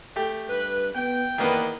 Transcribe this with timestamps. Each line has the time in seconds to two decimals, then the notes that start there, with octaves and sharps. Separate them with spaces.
0.16 A3 G4
0.49 G2 B4
0.95 B3 G5
1.38 E2 D#3 A#3 B3 D4 F#4 B4